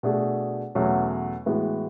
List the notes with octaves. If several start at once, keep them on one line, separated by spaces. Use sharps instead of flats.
B2 A3 D4 G#4
E2 B2 F#3 A3 C#4
A2 E3 G#3 B3 F#4